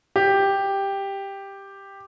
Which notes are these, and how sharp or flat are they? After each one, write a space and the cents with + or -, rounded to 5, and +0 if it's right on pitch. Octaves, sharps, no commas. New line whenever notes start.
G4 +5